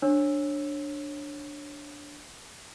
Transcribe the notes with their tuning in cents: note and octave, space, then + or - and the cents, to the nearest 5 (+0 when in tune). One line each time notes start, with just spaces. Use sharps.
D4 +0 C#5 -20 E6 +0